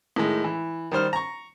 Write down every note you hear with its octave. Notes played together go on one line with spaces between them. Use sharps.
A2 D#3 G#3
E3
D#3 G3 C5 F6
A#5 C#6